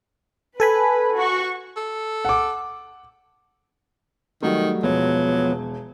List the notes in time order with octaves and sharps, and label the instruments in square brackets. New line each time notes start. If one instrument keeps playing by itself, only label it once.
[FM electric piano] A4 G#5 B5 [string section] B4
[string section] F#4 C#6
[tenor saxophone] A4
[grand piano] F#5 D6
[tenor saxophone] D#3 [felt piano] F#3 G3 A3
[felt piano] E1 [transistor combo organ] F3 B3 [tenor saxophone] F#3